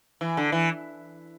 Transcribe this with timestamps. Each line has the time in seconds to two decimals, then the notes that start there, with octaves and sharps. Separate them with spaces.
0.21 E3
0.37 D3
0.52 E3